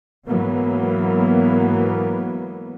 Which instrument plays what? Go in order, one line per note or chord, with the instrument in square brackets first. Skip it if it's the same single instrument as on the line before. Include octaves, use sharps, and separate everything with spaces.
[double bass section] G#2 E3 F#3 A#3 B3